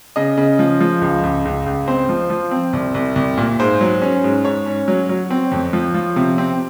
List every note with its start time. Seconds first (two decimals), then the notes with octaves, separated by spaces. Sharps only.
0.16 C#3 D#5
0.37 C#3
0.59 F3
0.81 F3
1.01 C#2
1.23 C#2
1.45 C#2
1.66 C#2
1.88 C4 C5
2.09 F3
2.30 F3
2.51 C4
2.73 C2
2.94 C2
3.16 C2
3.37 A#2
3.59 G#2 C5
3.81 F#3
4.02 C#4
4.24 G#2
4.45 G#2 C#5
4.66 C#4
4.88 F#3
5.09 F#3
5.30 C4
5.52 F2
5.73 F3
5.94 F3
6.16 C3
6.38 C4